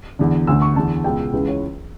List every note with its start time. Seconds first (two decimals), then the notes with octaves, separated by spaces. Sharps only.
0.19 E2 D3
0.47 D2 D3 E6
0.62 C#6
0.76 E2 D3 A5
1.04 C#2 B2 G5
1.33 C#2 C#3 E3 B4
1.48 C#5